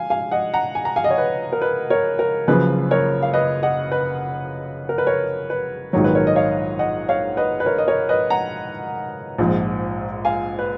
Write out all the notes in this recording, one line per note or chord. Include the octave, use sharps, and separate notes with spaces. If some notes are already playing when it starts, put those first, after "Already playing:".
Already playing: F5 G#5
F5 G#5
D#5 F#5
F#5 A#5
G#5
A#5
F5 G#5
D#5
C#5
B4
A#4
B4
A#4 C#5
A#4
F#1 F#2 C#3 F3 B4
A#4 C#5
F5
B4 D#5
D#5 F#5
B4
A#4
B4
A#4 C#5
B4
A#1 G#2 D#3 F#3 C#5
B4
A#4 C#5
D#5
C#5 F5
D#5 F#5
C#5 F5
B4 D#5
B4
A#4 C#5
D#5
A#4 C#5
B4 D#5
F#5 A#5
A#1 G#2 F3
F5 G#5
B4